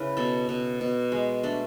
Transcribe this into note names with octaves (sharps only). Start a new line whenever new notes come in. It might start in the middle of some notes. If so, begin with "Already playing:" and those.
Already playing: C#3 E4 B4
B2 A4
B2
B2
G#3
A3 D4